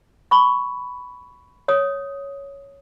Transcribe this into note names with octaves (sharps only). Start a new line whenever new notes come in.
B5 C#6
C#5 D#6